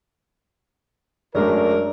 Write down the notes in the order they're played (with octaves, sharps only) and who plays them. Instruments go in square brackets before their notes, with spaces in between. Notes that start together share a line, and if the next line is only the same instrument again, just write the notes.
[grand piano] F#2 G#3 A3 [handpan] D4 D5 [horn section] A#4